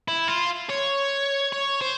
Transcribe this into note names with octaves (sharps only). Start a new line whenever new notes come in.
E4
F4
C#5
C#5
C5